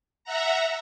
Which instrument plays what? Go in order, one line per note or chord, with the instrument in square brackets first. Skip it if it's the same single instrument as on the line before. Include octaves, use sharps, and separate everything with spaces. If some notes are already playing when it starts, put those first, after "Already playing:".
[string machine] E5 F#5 A#5